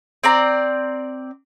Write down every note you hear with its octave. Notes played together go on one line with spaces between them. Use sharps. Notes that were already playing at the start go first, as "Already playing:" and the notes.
C4 D5 A#5